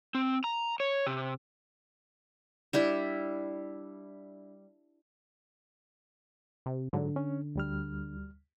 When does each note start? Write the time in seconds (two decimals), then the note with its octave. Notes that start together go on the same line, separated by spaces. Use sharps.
0.15 C4
0.44 A#5
0.80 C#5
1.07 C3
2.73 G3 D4 E4
6.66 C3
6.93 G#2 D3 F#3
7.16 C#4
7.56 D2 G3 F6